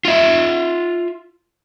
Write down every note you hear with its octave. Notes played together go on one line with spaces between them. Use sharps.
F4 E5